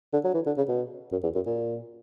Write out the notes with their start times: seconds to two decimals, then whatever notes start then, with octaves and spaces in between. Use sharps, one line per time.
0.13 D3
0.24 F#3
0.34 E3
0.46 D3
0.57 C#3
0.68 B2
1.12 F#2
1.23 E2
1.35 F#2
1.46 A#2